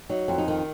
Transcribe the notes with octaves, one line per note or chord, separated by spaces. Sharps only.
F#3 D#4
F2
D#4
D#3